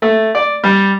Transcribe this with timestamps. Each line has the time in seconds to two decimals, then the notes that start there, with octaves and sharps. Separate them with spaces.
0.02 A3
0.35 D5
0.64 G3